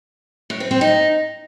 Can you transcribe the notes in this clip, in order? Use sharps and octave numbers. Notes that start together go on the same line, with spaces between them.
A2
C4
C4
D#4